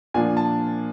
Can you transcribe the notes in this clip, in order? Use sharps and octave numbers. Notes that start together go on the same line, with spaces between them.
A#2 F3 A#3 D4 F4 G#5
A5